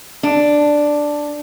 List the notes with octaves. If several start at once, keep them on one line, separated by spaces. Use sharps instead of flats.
D4